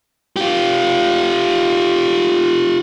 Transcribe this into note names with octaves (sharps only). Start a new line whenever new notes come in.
F4 G4